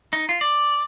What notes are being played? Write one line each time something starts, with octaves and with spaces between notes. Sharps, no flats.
D#4
F4
D5